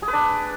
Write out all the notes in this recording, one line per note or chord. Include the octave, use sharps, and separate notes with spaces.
G#4
B4
D4